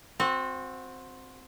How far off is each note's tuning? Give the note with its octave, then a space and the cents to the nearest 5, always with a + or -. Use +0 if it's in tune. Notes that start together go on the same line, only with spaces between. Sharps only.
C4 +0 F#4 -25